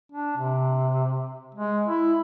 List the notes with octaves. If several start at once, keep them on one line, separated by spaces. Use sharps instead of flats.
D4
C3
G#3
E4